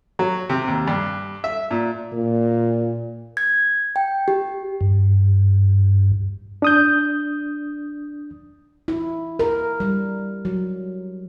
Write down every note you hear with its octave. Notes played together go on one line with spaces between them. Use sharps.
F#3
C3
D#2
G2
E5
A#2
A#2
G#6
G5
G4
G2
D4 D#6 G6
E4
A#4
G3
F#3